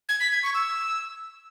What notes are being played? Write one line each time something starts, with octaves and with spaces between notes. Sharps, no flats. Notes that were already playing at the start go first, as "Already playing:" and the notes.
G#6
B6
G#6
C#6
E6